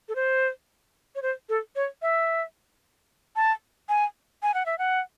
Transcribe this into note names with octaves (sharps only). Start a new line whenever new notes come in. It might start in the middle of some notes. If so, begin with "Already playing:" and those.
A4
C5
C#5
C5
A4
C#5
E5
A5
G#5
G#5
F#5
E5
F#5